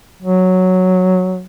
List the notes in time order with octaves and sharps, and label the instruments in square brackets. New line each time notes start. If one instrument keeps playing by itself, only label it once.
[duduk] F#3